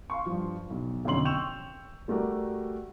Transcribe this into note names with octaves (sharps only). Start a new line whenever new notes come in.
F5 C6 C#6
G2 F3
B1
B1 F2 D3 C#4 C6 F#7
G5 C#6 E6 G6 E7 F7
G3 A3 F#4 A#4 D5